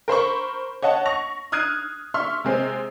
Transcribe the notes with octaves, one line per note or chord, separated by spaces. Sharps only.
A#4 C5 B5 C#6
C#5 D#5 F#5 A5
C#6 A#6 F7
D#6 F6 F#6 G#6 C7 D#7
E5 C6 C#6 F6
C3 G#3 C4